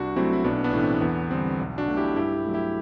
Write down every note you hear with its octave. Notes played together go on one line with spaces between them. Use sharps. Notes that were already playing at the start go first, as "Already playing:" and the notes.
Already playing: C2 D4 F#4
C3 F#3 A3 C4 E4
E4
B1 B3 D4
B3 D4
A2 E3 A3
C4
E2 B3
D3 G3 C4
B1
D4 F#4
B2 A3
E4 G4
G2 E4 G4
F#3 A3
E4 G4